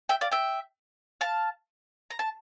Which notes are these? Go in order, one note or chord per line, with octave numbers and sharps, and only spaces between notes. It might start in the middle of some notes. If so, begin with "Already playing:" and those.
E5 G5
D5 F5
E5 G5
F5 A5
A#5
A5